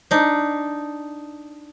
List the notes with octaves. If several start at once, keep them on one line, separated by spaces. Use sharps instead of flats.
D4 D#4